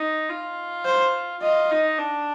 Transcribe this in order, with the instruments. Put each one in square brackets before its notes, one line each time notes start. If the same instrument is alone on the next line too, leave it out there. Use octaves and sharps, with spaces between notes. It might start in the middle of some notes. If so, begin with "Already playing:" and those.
Already playing: [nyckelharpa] D#4
F4
[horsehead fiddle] C5
[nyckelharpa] F4 [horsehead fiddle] D#5
[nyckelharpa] D#4
D4